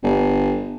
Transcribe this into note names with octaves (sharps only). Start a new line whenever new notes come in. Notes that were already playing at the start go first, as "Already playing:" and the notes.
G1